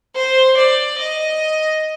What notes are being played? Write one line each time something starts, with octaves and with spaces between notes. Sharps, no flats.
C5
D5
D#5